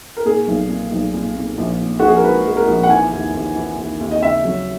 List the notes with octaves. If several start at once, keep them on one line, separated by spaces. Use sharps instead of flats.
A#4
A#2 G#4
B1
A#2
B1
A#2
A#2
A#1
A#2
A#1 F#4
G#4
A#4
G#3 B4
G#3
A#4
A#1
F#5
E3 G#5
D#2
D#2
E3
D#2
D#2
D#5
C#3 E5
F#3